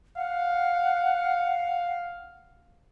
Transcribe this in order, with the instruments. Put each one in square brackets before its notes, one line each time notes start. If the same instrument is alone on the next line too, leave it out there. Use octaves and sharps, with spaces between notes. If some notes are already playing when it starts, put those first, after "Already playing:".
[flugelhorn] F5 [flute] F#5